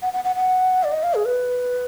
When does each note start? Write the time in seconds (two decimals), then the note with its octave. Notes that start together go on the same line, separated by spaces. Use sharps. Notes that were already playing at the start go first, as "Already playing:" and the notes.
0.02 F#5
0.13 F#5
0.24 F#5
0.36 F#5
0.84 D5
0.92 D#5
1.03 F5
1.14 G#4
1.25 B4